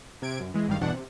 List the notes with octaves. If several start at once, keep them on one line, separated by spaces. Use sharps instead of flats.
C3 G#6 D7
F#2
E3 G#3
G#1 G2 D#3 G3 F5
G1 E2 B2 D4 F#5
C3